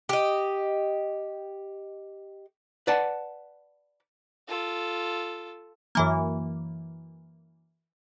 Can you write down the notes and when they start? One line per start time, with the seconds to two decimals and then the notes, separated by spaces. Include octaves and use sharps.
0.09 G4 D#5
2.87 B4 D5 F#5 A5
4.48 F4 A4
5.95 F#2 E3 A#3